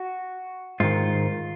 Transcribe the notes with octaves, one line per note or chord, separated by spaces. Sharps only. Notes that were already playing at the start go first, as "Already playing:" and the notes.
Already playing: F#4
G#2 D#3 F4